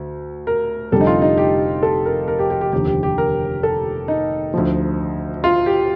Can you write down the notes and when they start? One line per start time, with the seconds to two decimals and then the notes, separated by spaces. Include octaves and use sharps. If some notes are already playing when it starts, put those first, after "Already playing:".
Already playing: D2
0.47 A#4
0.92 F1 F2 D3 G3 A4
1.01 D#4
1.07 F4
1.22 D#4
1.38 G4
1.83 A4
2.06 A#4
2.28 A#4
2.39 G4
2.50 G4
2.61 G4
2.72 F1 D#2 D3 F3 G4
2.87 G4
3.03 G4
3.18 A#4
3.63 A4
4.08 D#4
4.54 D2 D3 F3
5.44 F4
5.66 G4